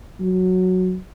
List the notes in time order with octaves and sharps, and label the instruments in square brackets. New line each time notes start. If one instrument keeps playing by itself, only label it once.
[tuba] F#3